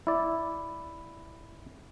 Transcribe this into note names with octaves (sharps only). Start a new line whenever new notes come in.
E4 D5